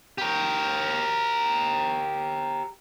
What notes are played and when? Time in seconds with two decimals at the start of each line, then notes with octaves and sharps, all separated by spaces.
0.18 G4 A#4